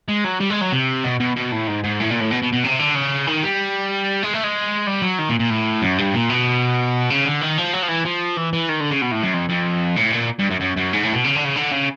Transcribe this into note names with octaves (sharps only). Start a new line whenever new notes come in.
G#3
F#3
G3
G#3
F#3
C3
B2
B2
B2
A2
G#2
G#2
A2
A#2
A2
B2
B2
B2
C3
D3
C#3
D#3
G3
G#3
A3
G#3
G3
F#3
D#3
A#2
A#2
A2
F#2
G2
A#2
B2
C#3
D3
D#3
F3
F#3
F3
E3
F3
E3
E3
D#3
D3
C#3
B2
A2
F#2
F2
F2
A2
A#2
G2
F#2
F#2
F#2
G#2
A2
B2
C#3
D3
C#3
D3
C#3